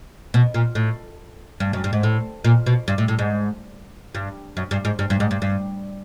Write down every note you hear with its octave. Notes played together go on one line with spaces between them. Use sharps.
B2
A#2
A2
G2
F#2
G2
G#2
A2
A#2
B2
G2
A2
A2
G#2
G2
F#2
G2
G#2
G2
G2
G#2
G2
G2